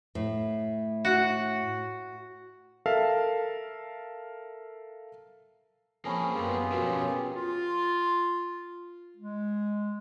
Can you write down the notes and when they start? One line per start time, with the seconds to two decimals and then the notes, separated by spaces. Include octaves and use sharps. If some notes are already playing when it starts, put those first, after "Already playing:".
0.15 A2
1.05 F#4
2.86 A4 A#4 E5 F5 A5
6.05 F3 A#3 C4 C#4 G#4 A5 B5 C#6
6.35 F#2 B3 F4 G4 G#4
6.72 B2 F3 B3 C#4 F#4 A#4 B4
7.34 F4
9.17 G#3